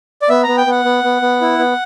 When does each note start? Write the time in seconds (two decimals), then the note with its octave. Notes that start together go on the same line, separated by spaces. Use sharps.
0.22 D5
0.29 B3 E5
0.43 B3 A#5
0.57 G5
0.66 B3 F#5
0.85 B3
1.04 B3
1.22 B3
1.41 E4
1.59 B3